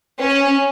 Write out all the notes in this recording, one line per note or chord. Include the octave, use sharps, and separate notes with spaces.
C#4